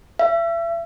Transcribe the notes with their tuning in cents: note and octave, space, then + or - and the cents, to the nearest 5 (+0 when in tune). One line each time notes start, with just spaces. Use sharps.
E5 +35